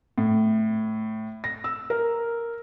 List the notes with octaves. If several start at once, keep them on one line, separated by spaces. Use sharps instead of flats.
A2
A#6
E6
A#4